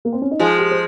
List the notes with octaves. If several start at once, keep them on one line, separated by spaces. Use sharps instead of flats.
A#3
C4
C#4
D#4
F3 G#3 F4
G4
C5